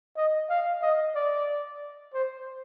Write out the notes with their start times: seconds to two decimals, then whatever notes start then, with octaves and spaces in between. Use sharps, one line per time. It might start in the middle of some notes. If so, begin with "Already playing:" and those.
0.17 D#5
0.49 F5
0.82 D#5
1.15 D5
2.13 C5